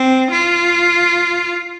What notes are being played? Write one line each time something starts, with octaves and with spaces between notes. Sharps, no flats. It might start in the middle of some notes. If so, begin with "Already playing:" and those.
Already playing: C4
F4